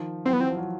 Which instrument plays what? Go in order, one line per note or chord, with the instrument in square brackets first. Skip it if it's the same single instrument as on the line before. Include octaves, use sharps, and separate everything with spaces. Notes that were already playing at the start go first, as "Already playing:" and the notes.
Already playing: [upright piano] D#3 F3
[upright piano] E3 F#3 [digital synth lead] C4
[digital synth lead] B3
[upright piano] E3 [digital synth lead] C4
[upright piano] F3
F#3